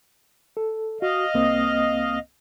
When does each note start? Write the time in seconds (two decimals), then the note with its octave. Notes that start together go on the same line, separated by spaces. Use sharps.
0.57 A4
1.02 F#4 D#5 F5
1.34 C2 A#3 C4